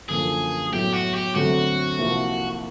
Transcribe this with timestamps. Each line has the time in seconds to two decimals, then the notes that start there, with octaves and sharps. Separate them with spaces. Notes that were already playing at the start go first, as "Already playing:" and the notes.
0.09 F#2 D3 F3 A#3 G#4
0.72 A2 F#3 B3 E4 G4
0.93 F#4
1.14 G4
1.35 D2 D3 F#3 A3 C4 F#4
1.98 C2 C3 F3 A#3